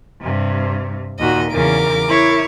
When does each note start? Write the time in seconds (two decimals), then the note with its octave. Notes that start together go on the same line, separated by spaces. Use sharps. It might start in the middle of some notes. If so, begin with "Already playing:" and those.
0.21 G2 C3
1.19 D#2 A#2 F#4 D#5
1.51 E2 C#3 A#4 D6
2.08 E4 C#5